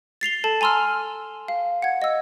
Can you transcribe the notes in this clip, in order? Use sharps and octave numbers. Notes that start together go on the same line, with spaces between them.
A6 C7 F7 G7
A4 A5
G#5 A#5 C6 E6 F6
F5
F#5 G#6
D#5 E6